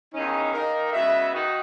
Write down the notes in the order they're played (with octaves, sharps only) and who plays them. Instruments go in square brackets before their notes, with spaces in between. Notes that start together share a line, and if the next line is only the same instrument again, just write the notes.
[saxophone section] E2 D#3 A#3 C#4 [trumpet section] D#4
[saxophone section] D#3 A#3 D#4 [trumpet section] A#4
[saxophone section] C#3 G#3 B3 F#4 [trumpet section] E5
[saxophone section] D#3 A#3 D#4 F#4